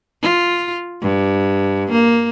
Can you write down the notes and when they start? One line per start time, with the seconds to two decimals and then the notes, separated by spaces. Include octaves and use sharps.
0.22 F4
1.02 G2
1.92 A#3